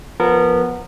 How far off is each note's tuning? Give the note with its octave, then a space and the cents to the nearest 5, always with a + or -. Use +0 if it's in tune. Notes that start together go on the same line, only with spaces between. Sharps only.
F3 +10 B3 -15 A#4 -25